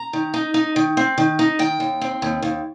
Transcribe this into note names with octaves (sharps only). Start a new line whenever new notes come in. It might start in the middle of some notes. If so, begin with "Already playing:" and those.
Already playing: A#5
D#3
D#4
D#4
D#3
C4
D#3
D#4
D#3 G5
D#2
C4
D#2
D#2